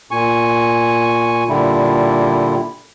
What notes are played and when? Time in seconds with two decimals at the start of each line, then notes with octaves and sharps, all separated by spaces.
0.11 A#2 G#5 C#6
1.49 A#2 D3 G3 E4